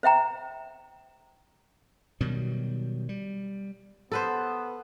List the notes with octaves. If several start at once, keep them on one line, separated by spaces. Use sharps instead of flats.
C5 E5 G5 A#5
B2 D#3 F#3 G3
G3
B3 A4 B4 C5